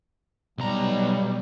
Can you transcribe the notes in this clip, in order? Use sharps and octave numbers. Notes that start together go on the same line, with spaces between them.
B1 G3 A#5